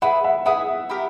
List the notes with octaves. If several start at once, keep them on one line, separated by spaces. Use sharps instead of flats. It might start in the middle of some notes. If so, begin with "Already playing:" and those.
E4 G#4 B4 E5 F#5
E5 F#5
E4 G#4 B4 E5 F#5
E4 G4 A#4